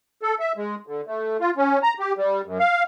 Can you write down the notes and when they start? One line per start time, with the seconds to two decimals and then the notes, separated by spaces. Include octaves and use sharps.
0.22 A4
0.40 E5
0.57 G#3
0.87 D3
1.07 A3
1.40 F4
1.57 C#4
1.83 A#5
1.99 G4
2.17 G3
2.46 F#2
2.59 F5